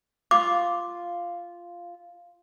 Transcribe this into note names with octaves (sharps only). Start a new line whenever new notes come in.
F4 D6